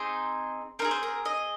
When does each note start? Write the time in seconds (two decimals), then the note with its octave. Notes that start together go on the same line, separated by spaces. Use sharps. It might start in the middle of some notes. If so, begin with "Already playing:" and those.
Already playing: C4 D#4 G#4 C5
0.79 C4 D#4 A#4
0.84 G#4
0.91 C5
1.03 A#4
1.25 D#5